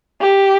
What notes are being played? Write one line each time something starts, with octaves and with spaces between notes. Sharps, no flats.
G4